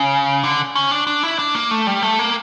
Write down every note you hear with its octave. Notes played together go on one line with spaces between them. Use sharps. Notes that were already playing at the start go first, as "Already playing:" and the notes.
Already playing: C#3
D3
C#4
D4
D4
E4
D4
A#3
A3
G3
A3
A#3